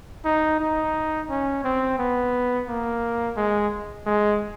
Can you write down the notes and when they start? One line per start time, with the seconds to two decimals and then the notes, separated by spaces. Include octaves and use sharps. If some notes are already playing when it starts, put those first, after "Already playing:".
0.25 D#4
0.60 D#4
1.30 C#4
1.64 C4
1.99 B3
2.68 A#3
3.36 G#3
4.06 G#3